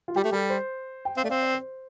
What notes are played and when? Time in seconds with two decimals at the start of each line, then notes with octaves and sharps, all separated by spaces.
0.08 F4
0.16 G3 G4
0.24 A3
0.32 G3 A4
0.50 C5
1.05 G5
1.17 C4 F5
1.24 A3 D5
1.29 C4 F5
1.42 D5
1.54 C5